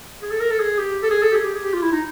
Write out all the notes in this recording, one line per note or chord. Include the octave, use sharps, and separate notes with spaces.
G#4
A4
A#4
A4
G#4
G4
A4
G#4
A4
G4
G#4
G4
G#4
G4
F4
E4
D#4